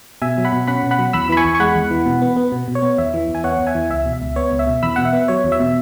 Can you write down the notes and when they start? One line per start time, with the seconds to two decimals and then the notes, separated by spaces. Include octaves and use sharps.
0.22 B2 E5 G#5
0.38 F#3
0.45 F#5 B5
0.53 B2
0.68 C#4 F#5 B5
0.83 B2
0.91 F#5 B5
0.99 F#3
1.13 E2 B5 E6
1.29 E3 B5
1.37 G#5 C#6
1.45 E2
1.55 C#6
1.60 G#3 F#5 B5
1.76 E2
1.91 E3
2.06 B2
2.22 B3
2.37 B3
2.52 B2
2.68 B2
2.75 C#5
2.82 B3
2.98 E2 E5
3.14 E3
3.28 E2
3.35 G#5
3.44 B3 C#5 F#5
3.59 E2
3.67 E5 G#5
3.75 E3
3.90 C#2 E5
4.06 B2
4.13 E5
4.22 C#2
4.36 B3 C#5
4.52 C#2
4.59 E5
4.67 B2
4.83 E2 B5 E6
4.96 B2 F#5
5.05 E5
5.13 B3
5.28 F#3 C#5
5.44 E2
5.52 E5
5.60 B2